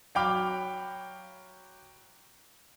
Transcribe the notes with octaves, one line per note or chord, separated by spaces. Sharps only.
F#3 F5 G5 B5 D6 F6